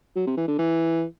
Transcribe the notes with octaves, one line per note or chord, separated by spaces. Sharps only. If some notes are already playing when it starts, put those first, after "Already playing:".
F#3
C3
E3
D3
E3